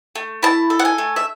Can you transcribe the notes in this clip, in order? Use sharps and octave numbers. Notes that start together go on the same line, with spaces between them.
A3
E4 A5
A4
F#5
G#5
A3
E5